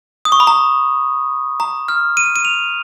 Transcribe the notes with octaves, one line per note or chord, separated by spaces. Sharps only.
D#6
C#6
B5
A#5
A#5
F6
D#7
D#7
F7